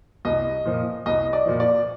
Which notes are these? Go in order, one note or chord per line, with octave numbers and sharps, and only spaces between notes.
C2 D#5
A#2 F3
C2 D#5
D5
A#2 F3
D5